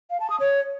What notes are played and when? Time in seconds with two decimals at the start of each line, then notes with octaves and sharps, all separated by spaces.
0.10 F5
0.20 A5
0.30 D#6
0.40 C#5